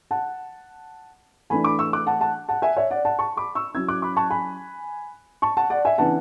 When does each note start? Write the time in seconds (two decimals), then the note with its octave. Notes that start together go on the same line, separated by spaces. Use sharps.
0.11 F#5 A5
1.50 E3 A3 D4 G#5 B5
1.64 B5 D6
1.79 C#6 E6
1.93 D6 F#6
2.07 F#5 A5
2.21 F#5 A5
2.49 F#5 A5
2.62 E5 G#5
2.77 C#5 E5
2.91 D5 F#5
3.05 F#5 A5
3.19 A5 C#6
3.37 B5 D6
3.55 C#6 E6
3.74 F#3 C#4 E4 E6 G#6
3.88 D6 F#6
4.02 B5 D6
4.16 A5 C#6
4.30 G#5 B5
5.42 A5 C#6
5.57 F#5 A5
5.70 D5 F#5
5.85 E5 G#5
5.98 C#3 E3 B3 D4 F#5 A5